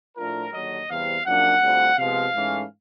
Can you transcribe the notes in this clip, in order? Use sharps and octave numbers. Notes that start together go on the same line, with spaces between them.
A2 F3 A3 D4 F4 A#4
D#2 D3 F#3 D#5
E2 C3 E3 G3 C4 F5
F#2 C#3 F3 A#3 D4 F#5
D2 D3 G3 C4 F4
C3 F3 G#3 B3 F5
G#2 E3 A3 C#4